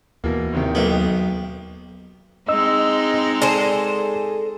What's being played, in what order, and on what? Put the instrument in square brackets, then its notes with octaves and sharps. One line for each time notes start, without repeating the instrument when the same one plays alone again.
[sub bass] D#2 [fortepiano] B2 E3 A#3
[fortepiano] G#1 C3 D#3
[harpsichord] B1 B3 [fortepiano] A#3 D#4
[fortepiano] G5
[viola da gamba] G#3 C4 D#4 [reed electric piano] D#5 E6
[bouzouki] G#4 A4 C5 [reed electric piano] D5 C6